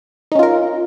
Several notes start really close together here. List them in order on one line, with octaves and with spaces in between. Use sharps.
D#4 C#4 F4 A#4